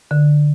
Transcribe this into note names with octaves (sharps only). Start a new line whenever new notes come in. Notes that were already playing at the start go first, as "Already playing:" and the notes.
D3